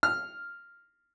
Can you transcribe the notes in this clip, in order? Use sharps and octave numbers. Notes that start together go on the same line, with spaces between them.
F6